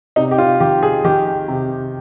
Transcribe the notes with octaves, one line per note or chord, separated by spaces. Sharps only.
C3 D#4
G4
F4
D#3 G4
G#4
D#3 G4
C3